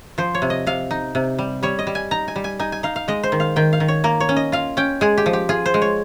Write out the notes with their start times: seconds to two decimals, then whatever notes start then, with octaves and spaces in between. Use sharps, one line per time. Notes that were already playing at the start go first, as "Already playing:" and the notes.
0.18 F3 C5
0.35 C#5
0.42 C3
0.50 D#5
0.67 C3 F5
0.91 D#4
1.15 C3
1.39 G3
1.63 G3 C#5
1.79 D#5
1.87 G3
1.95 G#5
2.11 D#4 A#5
2.28 G#5
2.36 G3
2.44 G#5
2.59 D#4 G#5
2.72 G#5
2.83 D#4 F5
2.96 F5
3.08 G#3 D#5
3.23 C5
3.32 D#3
3.40 F5
3.56 D#3 G5
3.73 F5
3.80 D#3
3.88 C#5
4.04 A#3 A#4
4.20 C#5
4.29 C#4
4.36 D#5
4.52 F4 F5
4.77 C#4 G5
5.01 G#3 G#4
5.18 G4
5.26 F3
5.33 G4
5.49 F4 G#4
5.66 C5
5.74 G#3
5.82 C#5